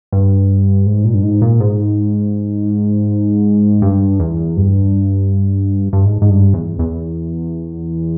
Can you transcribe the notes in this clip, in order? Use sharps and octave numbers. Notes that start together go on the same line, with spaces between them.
G2
G#2
A#2
G2
G#2
A#2
G#2
G2
E2
G2
G2
G#2
G#2
G2
E2
E2